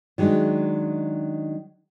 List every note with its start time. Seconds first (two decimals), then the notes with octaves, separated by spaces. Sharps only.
0.18 D#3 F#3 G#3 D4